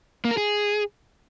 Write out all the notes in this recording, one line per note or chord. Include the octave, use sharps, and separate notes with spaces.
A#3
A#4
G#4